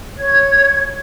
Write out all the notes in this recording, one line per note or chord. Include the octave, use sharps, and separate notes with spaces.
C#5 G#6